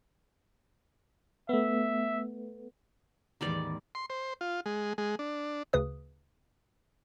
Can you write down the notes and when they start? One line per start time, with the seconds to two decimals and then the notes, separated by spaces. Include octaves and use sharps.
1.49 A3 B3 E5
3.41 E2 A2 D#3 G3 D5
3.95 C6
4.10 C5
4.41 F4
4.66 G#3
4.98 G#3
5.19 D4
5.73 D2 C#3 B4 D#6